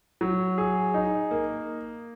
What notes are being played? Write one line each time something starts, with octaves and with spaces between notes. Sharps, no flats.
F#3
G#4
D#4
A#3